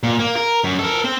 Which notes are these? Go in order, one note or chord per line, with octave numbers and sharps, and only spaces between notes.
A#2
A#3
A#4
F#2
A4 A#4
C4 C5